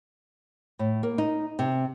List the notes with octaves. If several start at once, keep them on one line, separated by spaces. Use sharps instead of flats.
A2
A#3
D#4
C3